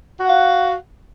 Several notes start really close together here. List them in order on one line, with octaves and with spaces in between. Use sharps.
F#4 F#5 F5